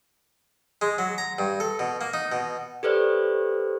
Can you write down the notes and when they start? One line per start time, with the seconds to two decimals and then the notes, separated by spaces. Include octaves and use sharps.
0.82 G#3
0.98 F#3
1.18 A#5
1.39 G2
1.60 A4
1.79 B2
2.01 A#3
2.13 D#4
2.32 B2
2.83 G4 A4 B4 C5 D5